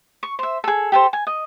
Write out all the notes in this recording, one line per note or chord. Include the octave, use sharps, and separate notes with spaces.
C#6
C5 E5
G#4 A4
G4 A4 C5
G#5
D#5